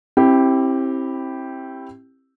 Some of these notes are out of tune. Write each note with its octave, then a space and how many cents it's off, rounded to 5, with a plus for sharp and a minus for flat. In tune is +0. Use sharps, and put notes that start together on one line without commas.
C4 +35 E4 +0 G4 +0